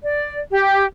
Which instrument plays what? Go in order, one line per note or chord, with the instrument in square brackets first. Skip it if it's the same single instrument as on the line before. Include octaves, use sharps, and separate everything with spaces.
[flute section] D5
G4